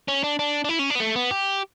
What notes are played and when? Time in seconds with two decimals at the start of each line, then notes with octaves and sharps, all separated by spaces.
0.08 C#4
0.24 D4
0.39 D4
0.65 D4
0.69 E4
0.79 C#4
0.90 D4
0.95 B3
1.00 A3
1.16 B3
1.31 G4